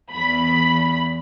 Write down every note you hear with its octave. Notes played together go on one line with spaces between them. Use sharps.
E2 B5